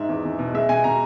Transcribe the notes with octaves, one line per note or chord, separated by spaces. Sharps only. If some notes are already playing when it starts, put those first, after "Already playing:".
Already playing: G#2 E5
E2
E2
B2
G#3 E5
B2 G#5
B2 A#5